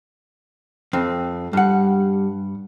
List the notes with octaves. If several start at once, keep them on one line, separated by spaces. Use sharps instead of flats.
F2 C4
G2 G3 F#5